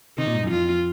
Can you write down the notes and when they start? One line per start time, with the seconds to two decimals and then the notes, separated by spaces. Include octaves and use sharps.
0.18 C3 D#3 D#4
0.27 A#2
0.34 G#2
0.43 F#2
0.51 F2 F4